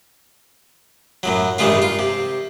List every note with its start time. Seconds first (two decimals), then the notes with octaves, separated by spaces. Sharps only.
1.23 F#2 A2 F#3
1.58 A1 G2 D#3 G#3 A3 F4
1.82 F4
1.99 C3